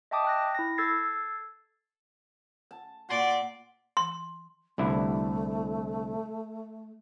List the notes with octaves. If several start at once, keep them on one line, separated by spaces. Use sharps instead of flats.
D#5 E5 G5 A5 D6 D#6
G5 F#6 A#6
E4 A#6
A4 E6 G#6 A6 C7
A5
A#2 F#4 D5 C6
C6
C2 D3 A3 E4